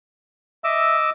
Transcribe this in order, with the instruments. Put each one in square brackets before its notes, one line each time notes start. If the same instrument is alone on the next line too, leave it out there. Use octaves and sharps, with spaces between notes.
[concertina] D#5 D6 E6 [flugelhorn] E5